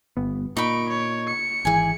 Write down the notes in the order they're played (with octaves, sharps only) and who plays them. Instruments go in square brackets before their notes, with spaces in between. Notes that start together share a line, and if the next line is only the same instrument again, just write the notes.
[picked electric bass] G1 B3
[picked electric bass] A#2 [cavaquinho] D#4 B5 [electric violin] C#6 D7
[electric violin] C#5
C#7
[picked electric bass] G#1 E3 [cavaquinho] G#4 G#5